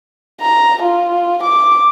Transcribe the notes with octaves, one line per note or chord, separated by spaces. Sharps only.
A#5
F4
D6